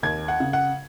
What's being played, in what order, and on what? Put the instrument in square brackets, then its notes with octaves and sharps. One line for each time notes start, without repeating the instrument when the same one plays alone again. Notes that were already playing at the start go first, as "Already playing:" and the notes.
[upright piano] D#2 G#6
F#5
C#3
F#5